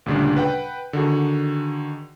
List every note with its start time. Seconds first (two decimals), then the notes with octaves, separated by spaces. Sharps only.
0.06 D2 A#2 C#3 G3 D4
0.36 B4 F#5 G5
0.93 D3 D#3 F#4 G#4